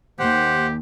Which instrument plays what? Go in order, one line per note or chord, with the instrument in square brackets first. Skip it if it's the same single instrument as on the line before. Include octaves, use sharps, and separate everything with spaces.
[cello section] D#2 [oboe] G4 [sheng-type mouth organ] C5 F#5